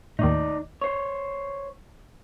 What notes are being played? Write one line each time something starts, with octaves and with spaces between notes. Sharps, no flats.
D#2 A2 D#4 D5
C5 C#5